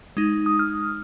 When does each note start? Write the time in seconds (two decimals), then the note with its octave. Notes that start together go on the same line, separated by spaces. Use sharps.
0.17 G#3 D#4
0.46 D#6
0.59 F6